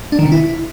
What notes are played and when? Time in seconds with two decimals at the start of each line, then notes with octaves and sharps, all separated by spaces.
0.12 D4
0.19 D#3
0.25 C3
0.32 E4